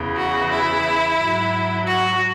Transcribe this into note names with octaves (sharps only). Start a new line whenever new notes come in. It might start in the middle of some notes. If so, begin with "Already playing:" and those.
Already playing: E2 C#3 E3
F#4
E4
G#2 F#3
F#4